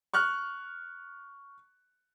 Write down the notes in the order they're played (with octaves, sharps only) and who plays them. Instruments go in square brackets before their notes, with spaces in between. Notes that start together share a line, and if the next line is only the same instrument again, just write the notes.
[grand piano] C#6 F6 F#6